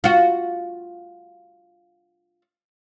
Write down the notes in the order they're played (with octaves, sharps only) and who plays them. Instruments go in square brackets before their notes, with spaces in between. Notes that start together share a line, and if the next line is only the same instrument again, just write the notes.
[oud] F4 F#4